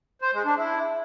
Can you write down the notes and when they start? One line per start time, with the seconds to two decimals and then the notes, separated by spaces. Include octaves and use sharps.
0.22 C5
0.33 G#3
0.45 D4
0.57 E4